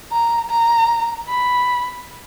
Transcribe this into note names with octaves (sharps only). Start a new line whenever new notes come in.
A#5
A#5
B5